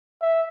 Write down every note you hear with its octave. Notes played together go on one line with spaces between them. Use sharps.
E5